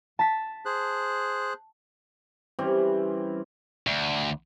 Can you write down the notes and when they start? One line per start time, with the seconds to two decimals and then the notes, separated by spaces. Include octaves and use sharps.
0.19 A5 B6
0.65 G#4 C5 F#6
2.59 E3 G3 C4 C#4
3.87 D2